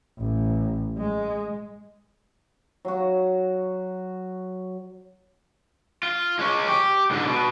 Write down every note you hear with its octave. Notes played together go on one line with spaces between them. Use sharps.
A1
G#3
F#3 F#4
F4
G#3 C#4
G4
G#2 D3
B2